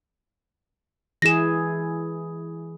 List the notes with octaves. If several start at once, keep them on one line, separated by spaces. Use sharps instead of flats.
E3 E4 G#4 A#6 E7